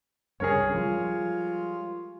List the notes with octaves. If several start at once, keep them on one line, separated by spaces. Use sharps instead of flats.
C2 G2 C#3 G#4 A#4 C#5
F3 G3 G#3 F4